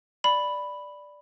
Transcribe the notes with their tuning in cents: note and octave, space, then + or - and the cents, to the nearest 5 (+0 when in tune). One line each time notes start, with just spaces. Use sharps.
D5 +0 B5 +0